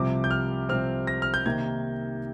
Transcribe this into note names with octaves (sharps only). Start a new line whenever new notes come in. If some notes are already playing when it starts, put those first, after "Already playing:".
Already playing: C2 C3 F3 C4 D6
G6
F6
C2 C3 F3 C4 F6
A#6
F6
G6
C3 D#3 A#3 D#4 G#6